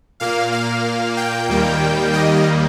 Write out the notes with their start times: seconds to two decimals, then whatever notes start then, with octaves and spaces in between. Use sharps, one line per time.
0.20 A#2 A#3 F5
0.52 F5
1.17 G5
1.49 D#2 D#3 G3 A#3
2.13 D#5